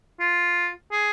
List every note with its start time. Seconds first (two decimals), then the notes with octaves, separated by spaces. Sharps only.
0.20 F4
0.92 G#4